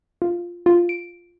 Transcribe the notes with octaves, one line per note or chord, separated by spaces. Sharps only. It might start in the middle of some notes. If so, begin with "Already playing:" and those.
F4
F4
D7